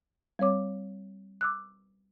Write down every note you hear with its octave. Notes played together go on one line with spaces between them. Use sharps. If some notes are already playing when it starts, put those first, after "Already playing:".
G3 C4 C#5 D6
D6 E6 F#6